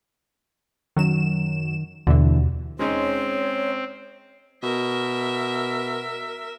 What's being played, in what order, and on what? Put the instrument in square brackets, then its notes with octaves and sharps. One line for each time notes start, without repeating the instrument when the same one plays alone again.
[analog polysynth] F#2 F#3 E7 [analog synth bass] D#3
[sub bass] D#2 [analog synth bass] B2 [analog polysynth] D3 E3
[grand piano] G#3 C#4 D#4 [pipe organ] C4 [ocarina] C#5
[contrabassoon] B2 [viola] A#4 E5